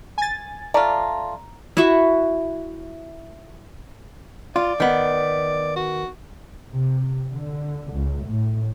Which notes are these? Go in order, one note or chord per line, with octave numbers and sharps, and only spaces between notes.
G#5 A6
A3 F4 D5 A#5
E4 F#4 E5 C#6
F4 D5
D#3 B3
F#4
C3
D3
C#2
A2